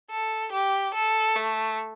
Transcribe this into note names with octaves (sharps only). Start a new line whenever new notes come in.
A4
G4
A4
A3